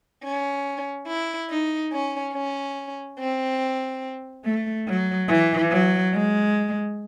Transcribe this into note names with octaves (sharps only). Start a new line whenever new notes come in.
C#4
E4
D#4
C#4
C#4
C4
A3
F#3
E3
F#3
G#3